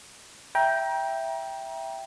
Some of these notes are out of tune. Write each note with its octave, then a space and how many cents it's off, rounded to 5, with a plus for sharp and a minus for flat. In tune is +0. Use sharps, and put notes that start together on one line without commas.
E5 +5 G5 +0 A#5 +30